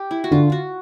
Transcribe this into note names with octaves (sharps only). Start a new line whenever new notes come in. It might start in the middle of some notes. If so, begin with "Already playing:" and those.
Already playing: G4
E4
F#4
D3 F4
F#4